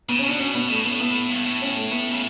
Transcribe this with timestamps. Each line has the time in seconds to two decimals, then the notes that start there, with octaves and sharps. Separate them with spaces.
0.09 C#3 B3
0.19 C#4
0.24 B2 D4
0.39 C#4
0.55 B3
0.69 A2 A3
0.85 B3
1.00 B3
1.30 G2
1.45 A2
1.62 C#4
1.76 A3
1.91 B3
2.11 C#3